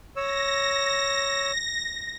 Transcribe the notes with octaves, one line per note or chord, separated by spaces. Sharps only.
C#5 E6 A#6